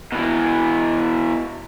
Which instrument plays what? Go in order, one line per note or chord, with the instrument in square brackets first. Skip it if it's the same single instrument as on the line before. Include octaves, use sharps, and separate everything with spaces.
[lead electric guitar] B2 E3